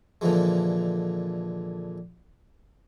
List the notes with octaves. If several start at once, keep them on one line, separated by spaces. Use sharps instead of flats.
A#2 D3 E3 F3 G#3